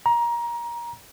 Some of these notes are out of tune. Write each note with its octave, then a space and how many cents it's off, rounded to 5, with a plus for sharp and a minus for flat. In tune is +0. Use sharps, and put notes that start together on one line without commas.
A#5 +20